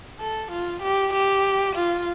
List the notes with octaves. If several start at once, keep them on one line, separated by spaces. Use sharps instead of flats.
A4
F4
G4
G4
F4